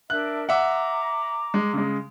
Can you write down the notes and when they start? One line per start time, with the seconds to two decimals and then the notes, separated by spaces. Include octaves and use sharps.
0.10 D4 A#4 E5 F#6
0.49 E5 F#5 A#5 D6
1.54 G#3
1.73 C#3 G#3